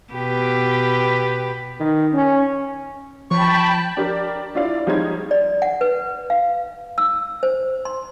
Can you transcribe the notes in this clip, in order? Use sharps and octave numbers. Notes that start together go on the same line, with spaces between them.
B2 G4 B4
D#3
C#4
F3 G5 A5 B5 C#6
D4 G4 A#4 D5
D4 E4 F4 D5 F5
F3 G3 G#3 D#4 C#5 G#6
D5
F#5
B4
F5
E6
C5
C6